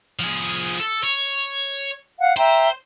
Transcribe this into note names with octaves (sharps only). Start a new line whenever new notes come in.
F3 G#4
A4
C#5
F5 F#5
C5 E5 G5 A#5